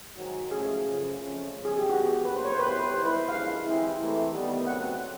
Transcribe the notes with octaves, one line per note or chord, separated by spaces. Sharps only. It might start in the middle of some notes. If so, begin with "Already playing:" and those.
G#2 D#3 F#3
A2 F3 A3 C#4 G#4
F#2 C#3 F3
F2 C#3 F3 A3 C#4
E2 C#3 F3 G#3
G#4
G4
G#2 E3 G3 B3 F#4
F#2 D3 F#3 A#3 B4
C5
C#5
C5
A2 F#3 B3 E4 G4 B4
C5
D#3 G3 B3 E4 C5
B4
F#2 D3 F3 G#3 F5
E3 G#3 C4 E4 G4
C3 E3 A3
D#3 G3 B3
C#3 F#3 A3 C4 F#5